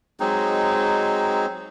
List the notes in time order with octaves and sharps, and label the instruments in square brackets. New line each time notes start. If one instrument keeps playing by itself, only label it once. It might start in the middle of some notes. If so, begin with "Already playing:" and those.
[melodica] F#3 G#3 C4 D#4